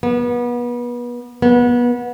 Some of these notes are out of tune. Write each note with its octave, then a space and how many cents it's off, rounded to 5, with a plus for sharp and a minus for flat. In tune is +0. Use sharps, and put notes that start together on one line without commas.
B3 -30
B3 -25